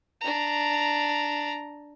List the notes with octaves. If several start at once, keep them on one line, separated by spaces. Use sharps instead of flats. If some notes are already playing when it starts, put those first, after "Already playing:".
D4 A#5